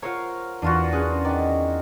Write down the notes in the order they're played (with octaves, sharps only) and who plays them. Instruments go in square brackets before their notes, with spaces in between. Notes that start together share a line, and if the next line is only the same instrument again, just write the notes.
[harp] F4 C5 C#5 [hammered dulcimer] A#4 F5 F#5
[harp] E2 [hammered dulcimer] D4 F4 F#4
[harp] B3 C#4 F#6 [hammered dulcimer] G#4
[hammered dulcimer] D#3 [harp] C#4 D5